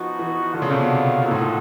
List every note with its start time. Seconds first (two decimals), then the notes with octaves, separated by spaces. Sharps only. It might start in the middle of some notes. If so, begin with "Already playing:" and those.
Already playing: F3 B3 D#4 F#4
0.19 E3
0.54 D3 A3 D4 F4
0.62 C#3
0.71 C3
0.80 B2
1.22 A#2 C4 D#4 F#4 A4
1.31 A2
1.39 A#2